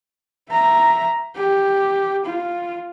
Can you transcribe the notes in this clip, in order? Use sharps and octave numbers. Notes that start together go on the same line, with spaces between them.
E5 A#5
G4
F4